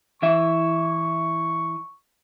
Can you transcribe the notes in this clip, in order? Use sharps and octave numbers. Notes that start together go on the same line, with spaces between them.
E3 E4 E5 C#6